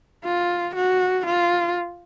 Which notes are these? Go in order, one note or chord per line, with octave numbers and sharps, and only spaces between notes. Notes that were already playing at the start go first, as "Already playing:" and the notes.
F4
F#4
F4